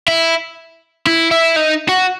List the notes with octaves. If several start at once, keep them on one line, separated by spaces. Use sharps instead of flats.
E4
E4
E4
D#4
F#4